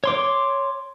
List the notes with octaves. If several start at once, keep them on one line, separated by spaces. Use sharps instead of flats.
C#5 C6 D6